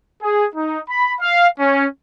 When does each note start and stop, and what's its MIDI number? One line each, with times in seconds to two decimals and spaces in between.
0.22 0.45 68
0.55 0.79 63
0.90 1.15 83
1.20 1.48 77
1.60 1.85 61